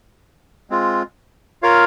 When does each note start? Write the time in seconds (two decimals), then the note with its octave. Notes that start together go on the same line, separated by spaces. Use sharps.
0.70 G#3 C4 F4
1.62 F4 A#4 C#5 F5